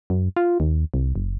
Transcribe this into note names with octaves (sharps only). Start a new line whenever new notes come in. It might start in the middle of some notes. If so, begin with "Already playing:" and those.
F#2
F4
D#2
C2
F#1